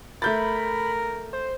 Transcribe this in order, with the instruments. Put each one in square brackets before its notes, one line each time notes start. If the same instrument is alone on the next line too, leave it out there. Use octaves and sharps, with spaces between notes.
[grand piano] A3 G6 A6 [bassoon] A#4 [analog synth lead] B5
[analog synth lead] C5